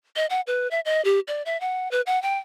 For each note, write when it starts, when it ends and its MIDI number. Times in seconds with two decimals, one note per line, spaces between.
0.16 0.26 75
0.30 0.41 78
0.47 0.68 71
0.71 0.80 76
0.85 1.02 75
1.05 1.20 67
1.28 1.42 74
1.46 1.59 76
1.61 1.90 78
1.91 2.01 71
2.07 2.21 78
2.22 2.38 79